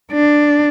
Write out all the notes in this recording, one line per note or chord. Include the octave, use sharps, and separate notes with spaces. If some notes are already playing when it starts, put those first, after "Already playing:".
D4